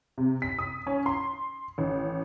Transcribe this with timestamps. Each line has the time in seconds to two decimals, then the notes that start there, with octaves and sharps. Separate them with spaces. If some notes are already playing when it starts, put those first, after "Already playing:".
0.18 C3
0.42 B6
0.59 D#6
0.87 C#4
1.06 C6
1.78 A1